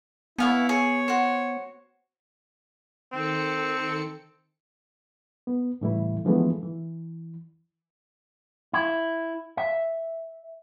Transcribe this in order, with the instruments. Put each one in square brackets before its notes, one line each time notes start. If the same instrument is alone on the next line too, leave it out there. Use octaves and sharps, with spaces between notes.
[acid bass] B3 [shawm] E4 [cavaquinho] C#5 F5 G#5
[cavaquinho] G#4 [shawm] C#5
[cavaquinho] F#4 C5
[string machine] D#3 A4 C#7 [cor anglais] C4
[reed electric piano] B3
A2 C#3 E3 G3 A3 E4
D3 E3 F3 G#3 A3 B3
E3
[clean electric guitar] E4
E5